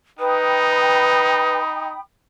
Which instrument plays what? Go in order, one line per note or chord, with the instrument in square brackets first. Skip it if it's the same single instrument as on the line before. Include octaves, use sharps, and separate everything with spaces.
[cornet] D#4 [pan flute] B4 [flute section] G5 B5 D#6